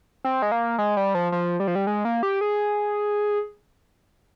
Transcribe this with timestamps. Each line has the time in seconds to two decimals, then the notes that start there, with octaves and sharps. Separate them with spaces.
0.25 C4
0.42 G#3
0.52 A#3
0.78 G#3
0.97 G3
1.15 F3
1.32 F3
1.60 G3
1.68 F3
1.75 G3
1.87 G#3
2.05 A#3
2.23 G4
2.41 G#4